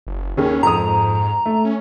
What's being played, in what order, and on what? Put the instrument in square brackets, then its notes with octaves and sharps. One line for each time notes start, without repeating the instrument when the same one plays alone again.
[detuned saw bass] F#1
[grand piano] D#2 C#3 [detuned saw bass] C#4
[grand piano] F2 D#6 [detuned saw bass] G#2 [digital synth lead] A#5
[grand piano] A3
[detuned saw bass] C#4